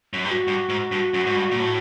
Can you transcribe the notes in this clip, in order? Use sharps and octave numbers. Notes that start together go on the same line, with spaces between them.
F#2
G2 G4
F#4
G2
G#2
G2
F#2
G#2
G2
A#2
A2